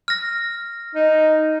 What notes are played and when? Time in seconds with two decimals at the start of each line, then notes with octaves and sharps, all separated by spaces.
0.08 F6 A#6
0.95 D#4